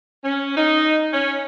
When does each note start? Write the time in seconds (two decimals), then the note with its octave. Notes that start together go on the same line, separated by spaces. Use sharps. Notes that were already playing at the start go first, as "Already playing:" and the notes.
0.25 C#4
0.57 D#4
1.13 C#4